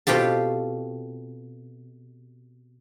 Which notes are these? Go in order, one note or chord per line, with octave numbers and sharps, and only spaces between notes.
B2 C4 F4 G4 A4